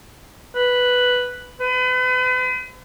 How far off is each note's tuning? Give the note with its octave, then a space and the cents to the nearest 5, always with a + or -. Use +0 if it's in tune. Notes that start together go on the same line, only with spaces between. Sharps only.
B4 +0
B4 +40